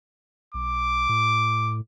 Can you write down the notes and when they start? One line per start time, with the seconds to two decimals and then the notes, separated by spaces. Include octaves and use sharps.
0.54 B1 D6
1.09 A2